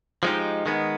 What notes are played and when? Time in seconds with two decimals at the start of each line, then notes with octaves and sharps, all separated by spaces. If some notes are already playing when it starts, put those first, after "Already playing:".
0.23 F3 G#3 C4 D#4 G4
0.66 D#3 G#3 B3